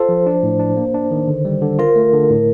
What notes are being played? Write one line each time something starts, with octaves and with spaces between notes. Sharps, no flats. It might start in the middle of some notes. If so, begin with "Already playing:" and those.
Already playing: F4 A4 C5
F3
D4
A2
D4
A#3
D4
D#3
D3
G3
D3
F4 A#4
A3
D3
A2